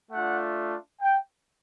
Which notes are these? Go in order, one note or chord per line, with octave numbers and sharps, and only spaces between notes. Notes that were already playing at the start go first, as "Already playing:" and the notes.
A3 D4 F4 F#5
G5